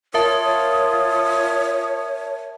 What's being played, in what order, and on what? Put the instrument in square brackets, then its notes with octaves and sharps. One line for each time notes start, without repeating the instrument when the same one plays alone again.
[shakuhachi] F4 [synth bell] A#4 E5 A5 [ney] C#5 [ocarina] D#6